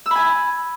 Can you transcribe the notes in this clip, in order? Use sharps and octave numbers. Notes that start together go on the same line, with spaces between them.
G#5 B5 E6